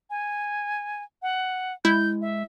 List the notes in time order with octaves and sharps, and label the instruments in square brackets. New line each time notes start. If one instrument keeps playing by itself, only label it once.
[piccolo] G#5
F#5
[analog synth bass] G#3 [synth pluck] E4 [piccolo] G6
[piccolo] E5